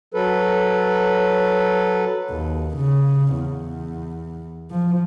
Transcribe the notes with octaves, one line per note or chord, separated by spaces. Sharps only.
F#3 A4 B4
D#2
C#3
E2
F3